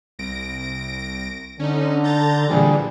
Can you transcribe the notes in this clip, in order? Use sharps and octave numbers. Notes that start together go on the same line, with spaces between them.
C2 A#6 D7
D3 C#4 D#4
A#5 G6 A6
A#1 A#2 D3 E3 G3 G#4